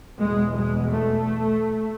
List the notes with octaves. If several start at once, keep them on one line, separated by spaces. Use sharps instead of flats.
E2 B2 G#3
G#3
A3